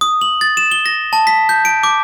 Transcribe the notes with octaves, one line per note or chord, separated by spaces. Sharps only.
D#6
F#7
A6
E7
G7
A#6
A5
B6
G6
D7
D6